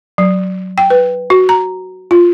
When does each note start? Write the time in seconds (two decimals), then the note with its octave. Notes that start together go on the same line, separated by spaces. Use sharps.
0.18 F#3
0.78 G5
0.90 B4
1.30 F#4
1.49 A#5
2.11 F4